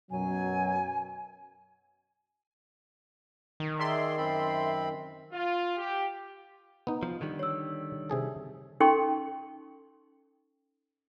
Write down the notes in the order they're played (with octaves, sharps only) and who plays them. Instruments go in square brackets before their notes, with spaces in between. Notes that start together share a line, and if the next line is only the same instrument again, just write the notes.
[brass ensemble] F#2 B2 F#3 [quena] G#5
[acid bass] D#3
[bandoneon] G#4 D5 [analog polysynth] E5 C6
[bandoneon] F#2 C4 B5
[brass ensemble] F4
G4
[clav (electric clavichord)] B3 D#4
[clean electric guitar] F3
D3 D#3 G3
[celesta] C#5 E6
[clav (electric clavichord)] C3 G#4 A4
[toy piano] C#4 D#4 A4 G5 C6 C#6